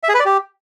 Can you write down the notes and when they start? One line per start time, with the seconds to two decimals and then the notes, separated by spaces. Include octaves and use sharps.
0.03 E5
0.09 G#4
0.14 B4
0.20 D5
0.25 G4